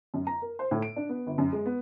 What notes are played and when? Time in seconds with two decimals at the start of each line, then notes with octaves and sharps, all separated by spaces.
0.14 F#2
0.27 A#5
0.42 A#4
0.59 C5
0.71 A2
0.82 D7
0.96 D4
1.09 B3
1.27 G1
1.38 F#2
1.53 G#3
1.66 B3